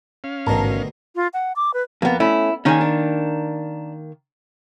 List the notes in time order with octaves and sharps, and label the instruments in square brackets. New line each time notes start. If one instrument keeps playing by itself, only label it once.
[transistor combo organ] C#4 F5
[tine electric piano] A1 G#2 [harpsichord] D2 B2 D#3 [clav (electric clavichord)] A#4 A5
[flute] F4
F#5
D6
B4
[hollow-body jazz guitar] F2 [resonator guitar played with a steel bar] A#3 B3
[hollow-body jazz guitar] A3 C#4 [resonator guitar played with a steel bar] E4
[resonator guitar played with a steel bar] D#3 A#3 [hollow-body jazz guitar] C#4 D#4 G#4
[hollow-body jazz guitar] D4